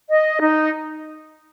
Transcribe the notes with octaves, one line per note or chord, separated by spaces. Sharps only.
D#5
D#4